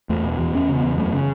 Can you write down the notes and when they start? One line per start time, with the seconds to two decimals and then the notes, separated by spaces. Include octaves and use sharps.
0.09 E2 A3
0.24 B2
0.39 E2
0.54 E2 C#4
0.69 C#3
0.75 B3
0.84 E2
0.97 F#2 A3
1.13 C#3